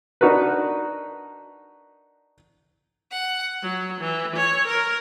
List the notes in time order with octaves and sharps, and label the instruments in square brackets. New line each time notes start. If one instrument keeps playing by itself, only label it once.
[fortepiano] D4 D#4 F#4 A#4 B4
[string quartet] F#5
F#3
E3
C#5
A#4